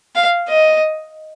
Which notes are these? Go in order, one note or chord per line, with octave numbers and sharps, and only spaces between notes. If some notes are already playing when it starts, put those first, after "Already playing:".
F5
D#5